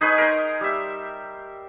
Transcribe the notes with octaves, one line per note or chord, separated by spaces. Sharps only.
D#4 G#4 B4 C#5
A#4 C5
G3 E5